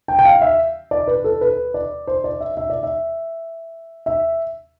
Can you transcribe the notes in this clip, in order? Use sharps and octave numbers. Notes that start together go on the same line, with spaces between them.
G5
G5
F5
E5
D5
B4
A4
B4
D5
C5
D5
E5
E5
D5
E5
E5